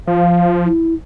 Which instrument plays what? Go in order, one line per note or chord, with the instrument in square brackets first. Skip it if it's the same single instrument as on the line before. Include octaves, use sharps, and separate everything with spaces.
[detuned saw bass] F3 [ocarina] F5
[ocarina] E4